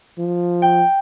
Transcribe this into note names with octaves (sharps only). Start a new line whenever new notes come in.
F3
G5